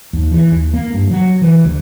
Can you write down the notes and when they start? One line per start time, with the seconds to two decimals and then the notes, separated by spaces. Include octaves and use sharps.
0.13 D#2
0.31 E3
0.51 D#2
0.73 A#3
0.94 G2
1.11 F#3
1.42 E3
1.65 D2